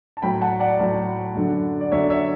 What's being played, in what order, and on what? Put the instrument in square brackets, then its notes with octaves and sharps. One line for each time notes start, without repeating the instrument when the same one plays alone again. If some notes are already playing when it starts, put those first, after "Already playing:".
[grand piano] A5
A2 F#3 G5 B5
F#5 A5
D5 F#5
A2 F#3
F#2 D3 F#3
D5
F#2 D3 F#3 C#5 E5
C#5 E5